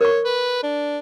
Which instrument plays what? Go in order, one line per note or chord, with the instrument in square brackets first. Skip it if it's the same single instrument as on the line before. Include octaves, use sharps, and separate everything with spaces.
[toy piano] A#4 C#6 [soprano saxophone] C#5
[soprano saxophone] B4
D4